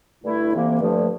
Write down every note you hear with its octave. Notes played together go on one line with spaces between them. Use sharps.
G2 D3 A3 E4
D2 C3 E3 A#3
G2 D3 F3 A3